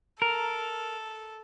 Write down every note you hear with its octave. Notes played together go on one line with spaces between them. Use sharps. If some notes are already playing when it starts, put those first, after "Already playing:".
A4 A#4